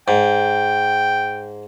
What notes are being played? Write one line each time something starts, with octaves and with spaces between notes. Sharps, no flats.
G#2 G5